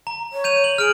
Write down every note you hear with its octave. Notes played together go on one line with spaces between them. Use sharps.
A#5
C#5
G6 D#7 F7
F#7
G#4 F6 D7